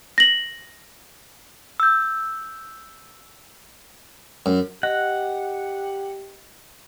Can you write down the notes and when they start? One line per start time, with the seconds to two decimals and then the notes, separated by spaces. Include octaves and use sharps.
0.18 A#6 F#7
1.80 E6 G6
4.46 F#2
4.83 G4 D#5 F#5